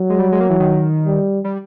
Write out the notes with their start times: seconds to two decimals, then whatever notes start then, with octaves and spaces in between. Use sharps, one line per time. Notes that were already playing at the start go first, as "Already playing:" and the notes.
Already playing: F#3
0.10 G#3
0.19 G3
0.32 G#3
0.40 A#3
0.50 E3
0.60 D#3
1.06 G3
1.44 G3